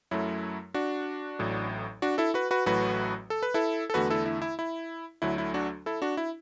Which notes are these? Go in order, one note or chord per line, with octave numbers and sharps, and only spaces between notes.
F#2 F#3 A3 E4
D4 F#4
A1 A2 F#3
D4 F#4
E4 A4
F#4 B4
F#4 B4
A1 A2 F#3 A3 F#4 B4
A4
B4
E4 A4
A4
E2 D3 A3 F#4 B4
E4 A4
E4
E4
E4
D2 D3 F#3 A3 E4
E4
D4 F#4
E4 A4
D4 F#4
E4